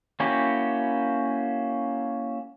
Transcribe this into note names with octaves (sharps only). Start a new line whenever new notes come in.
A#3 C#4 E4 F#4 G4